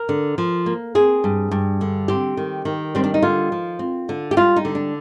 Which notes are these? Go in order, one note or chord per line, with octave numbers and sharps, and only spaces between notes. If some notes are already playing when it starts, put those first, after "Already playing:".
Already playing: A#4
D3
F3
A#3
C4 G#4
G2
G2
D3
C4 G4
D#3
D#3
G3 C4
D4
D#4
D3 F4
F3
C4
D3
G4
G3 F4
D#4
D3
D4